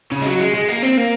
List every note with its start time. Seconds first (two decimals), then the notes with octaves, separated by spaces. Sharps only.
0.12 C#3
0.22 G#3
0.26 F#3
0.40 G#3
0.54 G#3
0.69 A#3
0.83 C4
0.97 A#3